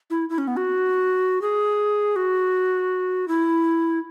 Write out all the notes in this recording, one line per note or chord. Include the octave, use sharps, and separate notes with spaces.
E4
E4
C#4
B3
F#4
G#4
F#4
E4